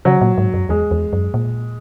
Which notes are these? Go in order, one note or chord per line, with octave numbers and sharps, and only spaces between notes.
C#3 F#3
A#2
G#2
F#2
E2 G#3
E2
F#2
A#2